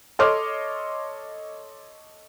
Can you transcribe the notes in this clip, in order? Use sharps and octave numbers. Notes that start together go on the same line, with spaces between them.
A4 C#5 D#5 C6 D6 F6